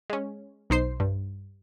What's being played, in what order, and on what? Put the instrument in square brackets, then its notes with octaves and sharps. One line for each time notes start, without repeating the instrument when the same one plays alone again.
[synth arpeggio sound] G#3 C#4
B1 D#4 C5 C7
G2